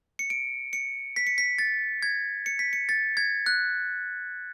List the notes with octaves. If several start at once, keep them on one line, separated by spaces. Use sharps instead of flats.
C#7
D7
C#7
B6
C#7
B6
A6
G#6
C#7
B6
C#7
A6
G#6
F#6